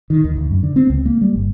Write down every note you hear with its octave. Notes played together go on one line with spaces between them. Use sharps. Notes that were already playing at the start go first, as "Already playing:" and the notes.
D#3
D#2
D2
F#2
D3
C4
C#2
A#3
G3
G1